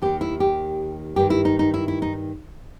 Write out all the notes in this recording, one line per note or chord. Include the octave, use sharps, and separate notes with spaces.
D#2 D#3 G4
E4
G4
G2 D#3 G4
E4
D#4
D#4
E4
E4
D#4